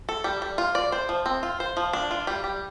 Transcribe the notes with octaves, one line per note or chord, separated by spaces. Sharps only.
A4
G3
G3
F4
D5
C5
F3
C4
F4
C5
F3
D4
F4
G3
G3